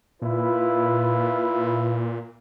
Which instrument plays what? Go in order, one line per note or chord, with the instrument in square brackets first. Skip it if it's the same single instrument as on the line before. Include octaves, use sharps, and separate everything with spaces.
[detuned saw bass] A#2 [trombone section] E4 F4 B4